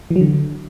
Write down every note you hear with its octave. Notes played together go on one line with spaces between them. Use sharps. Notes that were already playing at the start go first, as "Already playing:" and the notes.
E3
F#3
D3